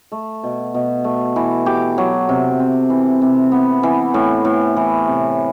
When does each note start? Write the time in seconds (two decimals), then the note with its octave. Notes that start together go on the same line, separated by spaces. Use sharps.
0.12 A3
0.43 B2
0.74 B2
1.04 A3
1.36 E3
1.66 G4
1.98 F#3
2.29 C3
2.60 C4
2.90 E3
3.22 C3
3.52 B3
3.83 E3
4.14 A2
4.45 A2
4.77 E3
5.07 C3